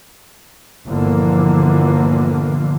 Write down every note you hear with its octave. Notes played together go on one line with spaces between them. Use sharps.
G1 A#2 D3 E3 F3 A#3